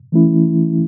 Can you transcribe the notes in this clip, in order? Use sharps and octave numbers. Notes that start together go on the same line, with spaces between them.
E3 A3 C#4 E4